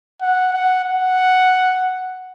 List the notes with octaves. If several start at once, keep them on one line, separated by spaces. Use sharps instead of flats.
F#5
F#5
F#5